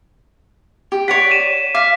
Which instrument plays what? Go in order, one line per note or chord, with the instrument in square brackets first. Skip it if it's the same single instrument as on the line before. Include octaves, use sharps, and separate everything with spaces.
[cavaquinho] G4
[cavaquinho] C#5 D5 F#5 [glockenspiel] B6 D7
[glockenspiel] D#7 E7
[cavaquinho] F5 [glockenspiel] D6 B6